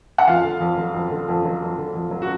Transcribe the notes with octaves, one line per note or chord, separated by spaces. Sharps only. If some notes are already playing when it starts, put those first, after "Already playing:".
F#5
F2 F4 F5
D3
F2
F#3
F2
D3
F2
F#3
F2
D3
F2
F#3
F#4